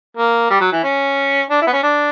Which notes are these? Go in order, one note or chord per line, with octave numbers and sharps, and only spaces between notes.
A#3
G3
F#3
E3
C#4
D4
E4
B3
C#4
D4